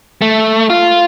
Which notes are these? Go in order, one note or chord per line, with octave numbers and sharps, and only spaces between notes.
A3
F4